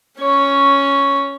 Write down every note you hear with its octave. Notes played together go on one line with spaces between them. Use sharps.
C#4 C#5